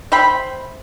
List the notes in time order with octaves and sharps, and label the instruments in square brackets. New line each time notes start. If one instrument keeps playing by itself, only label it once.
[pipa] C5 E5 G5 B5